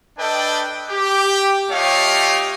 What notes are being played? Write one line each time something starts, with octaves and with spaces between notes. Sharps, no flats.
D4 A4 B4 D#5 G5
G4
A3 F4 G4 C#5 D#5 F5